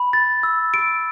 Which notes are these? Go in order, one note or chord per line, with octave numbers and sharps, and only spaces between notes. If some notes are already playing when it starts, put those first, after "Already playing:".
Already playing: B5
A6
E6
D7